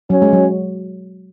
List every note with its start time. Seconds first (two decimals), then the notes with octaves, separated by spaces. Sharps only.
0.10 F#3 C#4
0.22 G#3
0.33 F#3